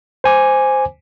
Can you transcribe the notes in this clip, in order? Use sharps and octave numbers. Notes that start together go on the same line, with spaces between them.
C5 G#5 D6